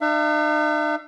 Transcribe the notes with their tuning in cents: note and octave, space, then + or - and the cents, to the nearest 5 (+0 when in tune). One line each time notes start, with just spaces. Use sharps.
D#4 -45 E5 +40